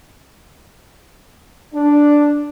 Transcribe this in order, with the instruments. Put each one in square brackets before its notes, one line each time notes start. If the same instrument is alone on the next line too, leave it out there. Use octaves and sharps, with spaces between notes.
[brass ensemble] D4